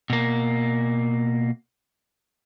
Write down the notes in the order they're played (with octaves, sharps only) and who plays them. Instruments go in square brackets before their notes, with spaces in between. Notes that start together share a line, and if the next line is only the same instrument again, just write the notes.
[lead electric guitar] B2 A#3